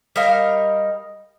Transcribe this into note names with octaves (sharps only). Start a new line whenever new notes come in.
G3 D#4 A#4 F5